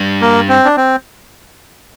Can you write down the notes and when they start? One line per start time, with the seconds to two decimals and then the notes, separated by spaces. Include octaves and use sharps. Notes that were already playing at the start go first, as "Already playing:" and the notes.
Already playing: G2
0.21 A#3
0.48 C4
0.65 D4
0.77 C4